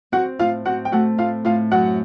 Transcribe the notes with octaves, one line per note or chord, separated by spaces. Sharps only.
C4 F#4 F#5
A2 F4 F5
C4 F#4 F#5
G5
A3 F#4 F#5
A2 F4 F5
A2 F4 F5
F#2 F#4 F#5